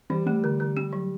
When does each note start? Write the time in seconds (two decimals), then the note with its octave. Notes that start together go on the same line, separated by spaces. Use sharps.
0.10 E3 G3
0.26 G3 A3
0.44 D3
0.60 D3
0.77 G3 G4
0.93 F#3